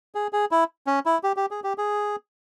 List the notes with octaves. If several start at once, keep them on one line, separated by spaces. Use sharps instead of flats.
G#4
G#4
E4
C#4
E4
G4
G4
G#4
G4
G#4